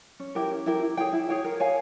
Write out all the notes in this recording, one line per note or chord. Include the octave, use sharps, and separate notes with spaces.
C#4
E4 G4 A#4
C#4
E4 G4 A#4
E4
G#4 C#5 G5
E4
G#4 C#5 G5
A#4
C#5 F5 G#5